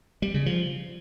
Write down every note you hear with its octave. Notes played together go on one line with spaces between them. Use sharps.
G3
C#3
F3